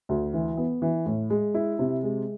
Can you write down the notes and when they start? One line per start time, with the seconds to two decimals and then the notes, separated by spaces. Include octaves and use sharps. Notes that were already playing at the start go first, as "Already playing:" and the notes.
0.09 D2
0.33 E3
0.57 B3
0.82 E3
1.06 A2
1.30 G#3
1.54 E4
1.79 C3
2.03 G#3